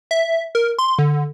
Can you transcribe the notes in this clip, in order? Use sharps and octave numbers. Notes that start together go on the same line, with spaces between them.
E5
A#4
C6
D3